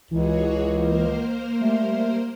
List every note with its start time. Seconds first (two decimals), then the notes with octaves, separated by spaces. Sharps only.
0.11 C#2 E3 F#4 G#4 C#5
0.68 A#3 A#4 C5
1.61 G3 A3